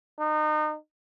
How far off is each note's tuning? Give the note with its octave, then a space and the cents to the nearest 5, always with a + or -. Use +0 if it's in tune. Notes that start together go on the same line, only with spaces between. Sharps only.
D#4 -30